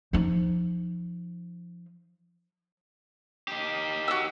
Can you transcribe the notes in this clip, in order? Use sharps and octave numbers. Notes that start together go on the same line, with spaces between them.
F3 D#4
D#3 G4
F#4 E6